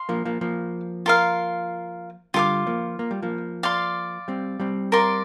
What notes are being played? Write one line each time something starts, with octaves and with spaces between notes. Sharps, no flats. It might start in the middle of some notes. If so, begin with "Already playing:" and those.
Already playing: F5 C6
F3 A#3
F3 A#3
F3 A#3
F4 A#4 F5
D3 G3 F4 A#4 F5 D6
F3 A#3
A#3
G3
F3 A#3
D5 F5 C6
G3 C4
G3 C4
A#4 D5 F5 C6